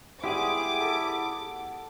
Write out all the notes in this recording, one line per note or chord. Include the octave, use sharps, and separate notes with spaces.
G3 G#3 B3 E4 G4 G#4 D6
A4